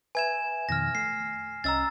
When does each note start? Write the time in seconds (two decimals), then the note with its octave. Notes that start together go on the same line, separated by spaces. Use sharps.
0.15 B4 E5 G#5 G#6 E7
0.69 F2 B2 D#3 F6 A#6
0.95 A3 C7
1.64 C2 C#4 D#5 A#5 E6 A6